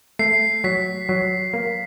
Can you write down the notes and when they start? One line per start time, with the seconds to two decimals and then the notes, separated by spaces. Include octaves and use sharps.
0.19 A3 C7
0.64 F#3 B6
1.09 F#3
1.53 A#3